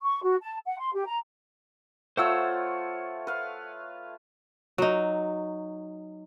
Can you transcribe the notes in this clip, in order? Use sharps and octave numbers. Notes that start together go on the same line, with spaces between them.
C#6
F#4
A5
F#5
C6
G4
A#5
A3 F4 C5 C#5 F#5 E6
B4 F5
F#3 D#4